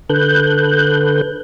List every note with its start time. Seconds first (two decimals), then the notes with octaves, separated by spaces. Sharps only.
0.09 D3 A4 B4 F#6 G6